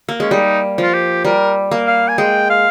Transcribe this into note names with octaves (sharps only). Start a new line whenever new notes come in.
A#3
G#3 C#4
G3 D#4
F3 F4
G4
G3 A#4
A#3
F5
G#5
G#3 G5
F5